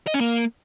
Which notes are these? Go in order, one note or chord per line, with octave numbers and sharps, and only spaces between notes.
D#5
C#4
A#3